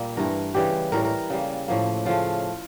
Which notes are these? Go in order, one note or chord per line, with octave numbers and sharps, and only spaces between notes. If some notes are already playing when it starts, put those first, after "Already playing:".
Already playing: A#2 G3 A#3
G2 E3 A3 A#4
C#3 E3 G3 G4
A2 E3 G3 A#4
A#4
C#3 G3 A#3
A2 F3 A#3
C#3 F3 A3 F4